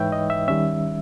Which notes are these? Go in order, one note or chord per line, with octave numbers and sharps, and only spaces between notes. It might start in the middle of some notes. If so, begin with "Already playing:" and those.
Already playing: G#2 E3 G#3 D#4 B4 C#5 E5 G5
D#5
E5
D#3 G3 C#4 E5